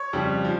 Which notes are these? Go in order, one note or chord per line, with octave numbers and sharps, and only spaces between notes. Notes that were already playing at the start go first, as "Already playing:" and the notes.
Already playing: C#5 C#6
F2 C#3 G3
F3